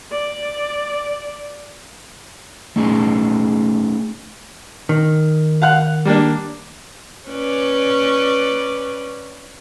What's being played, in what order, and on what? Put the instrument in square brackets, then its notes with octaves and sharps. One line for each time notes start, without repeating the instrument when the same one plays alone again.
[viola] D5
[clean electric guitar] A3 C#4 D#4 G#4 G#5
[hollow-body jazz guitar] D#3
[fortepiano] F5 F#5 F#6
G3 A#3 D4
[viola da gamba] C#4 B4 D5